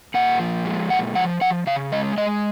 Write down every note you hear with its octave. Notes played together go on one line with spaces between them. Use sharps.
A#2 F#5
F3
G#3
A#2 F#5
F3 F#5
F3 F#5
C#3 F5
G#3 D#5
G#3 D#5